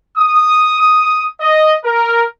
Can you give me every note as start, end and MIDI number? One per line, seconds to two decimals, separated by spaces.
0.17 0.77 87
0.80 1.26 87
1.41 1.76 75
1.85 2.25 70